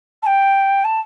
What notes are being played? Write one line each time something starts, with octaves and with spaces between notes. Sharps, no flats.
A5
G5
A5